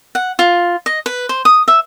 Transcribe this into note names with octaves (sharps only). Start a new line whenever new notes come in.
F#5
F4
D#5
B4
C5
D#6
E5